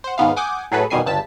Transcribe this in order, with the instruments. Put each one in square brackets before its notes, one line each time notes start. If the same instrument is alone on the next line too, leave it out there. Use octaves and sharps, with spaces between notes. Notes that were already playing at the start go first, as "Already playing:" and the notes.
[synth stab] C5 F#5
D#2 G#2 B3 F5
F#5 G#5 D6 D#6 G6
A2 F#3 G#4 A4 B4
F2 B2 D#3 G3 G#5 C7
G1 C#2 G2 A5 B6 E7